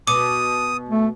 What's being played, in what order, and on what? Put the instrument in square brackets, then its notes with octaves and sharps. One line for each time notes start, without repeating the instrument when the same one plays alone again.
[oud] B2 [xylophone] D6 [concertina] D#6
[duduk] A3